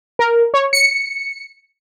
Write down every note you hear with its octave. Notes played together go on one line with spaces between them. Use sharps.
A#4
C#5
C#7